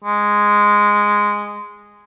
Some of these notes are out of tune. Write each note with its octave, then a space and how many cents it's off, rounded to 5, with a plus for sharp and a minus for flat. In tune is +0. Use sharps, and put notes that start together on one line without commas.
G#3 -5